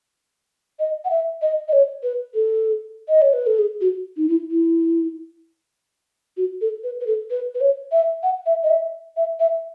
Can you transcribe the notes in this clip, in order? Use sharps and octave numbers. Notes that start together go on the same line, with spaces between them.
D#5
F#5
E5
D#5
D#5
C#5
B4
A4
D#5
C#5
B4
A4
G#4
F#4
D#4
E4
E4
F#4
A4
B4
B4
A4
B4
B4
C#5
E5
F#5
E5
D#5
E5
E5
E5